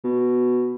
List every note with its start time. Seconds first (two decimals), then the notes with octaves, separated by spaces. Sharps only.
0.04 B2